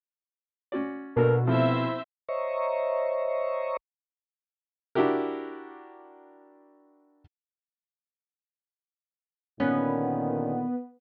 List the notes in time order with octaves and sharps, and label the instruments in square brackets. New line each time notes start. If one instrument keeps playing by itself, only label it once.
[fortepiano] C#4 F#4 D5
[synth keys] B2 [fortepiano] A#3 D4 A4 [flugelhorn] A#4
[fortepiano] C3 F3 A3 [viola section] C4 C5 E5 [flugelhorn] E4
[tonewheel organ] C5 C#5 D#5 E5 A#5 C#6
[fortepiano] D4 E4 F#4 G4 A#4
[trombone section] A#2 D3 D#3 [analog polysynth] B3 [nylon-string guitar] C#4